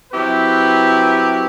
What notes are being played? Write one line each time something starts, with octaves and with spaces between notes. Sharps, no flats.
F#3 C4 E4 G4 B4